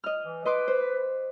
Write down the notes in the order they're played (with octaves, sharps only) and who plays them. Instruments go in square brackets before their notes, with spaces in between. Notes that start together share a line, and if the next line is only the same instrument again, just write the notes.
[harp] D#5 F6
[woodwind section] E3
[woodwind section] B4 [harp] D#5 C6 D6
[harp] C5